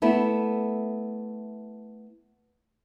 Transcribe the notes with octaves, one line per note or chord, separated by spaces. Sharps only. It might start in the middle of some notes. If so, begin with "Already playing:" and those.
A3 B3 E4